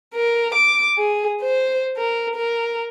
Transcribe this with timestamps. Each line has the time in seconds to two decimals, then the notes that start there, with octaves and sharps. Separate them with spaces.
0.14 A#4
0.54 D6
0.97 G#4
1.42 C5
1.97 A#4
2.36 A#4